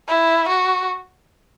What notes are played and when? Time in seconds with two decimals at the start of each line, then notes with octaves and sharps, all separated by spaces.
0.08 E4
0.49 F#4